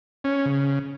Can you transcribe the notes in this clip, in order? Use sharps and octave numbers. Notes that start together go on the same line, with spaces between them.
C#4
C#3